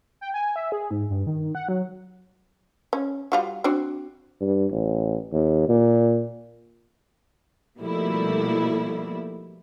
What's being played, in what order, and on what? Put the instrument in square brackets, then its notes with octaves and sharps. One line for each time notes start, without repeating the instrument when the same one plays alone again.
[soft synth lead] G5
G#5
E5
G#4
G#2
G2
D#3
F#5
F#3
[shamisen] C#4
G3 F4 F#4
C4 D4 F#4
[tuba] G2
A1
D#2
A#2
[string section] B2 F3 G3 A3 A#3 E4